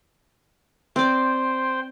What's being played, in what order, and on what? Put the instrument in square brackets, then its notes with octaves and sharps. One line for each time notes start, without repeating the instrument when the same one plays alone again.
[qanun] C4 D5 [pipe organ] C5 G5 C6